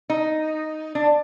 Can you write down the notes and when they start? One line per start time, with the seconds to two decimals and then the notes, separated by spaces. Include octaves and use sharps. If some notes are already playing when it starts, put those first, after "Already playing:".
0.10 D#4
0.95 D4